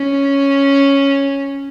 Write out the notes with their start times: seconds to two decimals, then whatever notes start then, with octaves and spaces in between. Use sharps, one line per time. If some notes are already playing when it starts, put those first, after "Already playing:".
Already playing: C#4